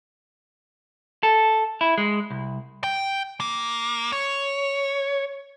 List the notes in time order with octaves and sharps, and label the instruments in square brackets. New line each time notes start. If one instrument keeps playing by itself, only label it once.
[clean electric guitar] A4
E4
G#3
C2
[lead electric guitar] G5
A#3
C#5